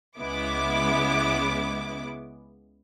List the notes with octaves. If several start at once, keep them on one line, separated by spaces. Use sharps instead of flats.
C#2 C#3 G#3 B3 E4 D6